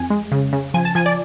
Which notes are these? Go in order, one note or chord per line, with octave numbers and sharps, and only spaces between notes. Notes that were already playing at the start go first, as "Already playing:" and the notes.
Already playing: F2 G#5
G#3
C#3
C#3
F3 G#5
A5
F3 G#5
D5